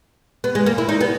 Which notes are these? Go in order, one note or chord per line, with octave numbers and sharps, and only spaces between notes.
B3
G#3
A#3
E4
D#4
B3